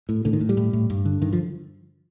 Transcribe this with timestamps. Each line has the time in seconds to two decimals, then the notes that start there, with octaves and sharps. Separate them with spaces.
0.09 A2
0.25 A2 D3
0.33 D#3
0.41 A2
0.49 G3
0.57 A2
0.73 A2
0.90 G2
1.05 D3
1.21 G2 D#3
1.33 F3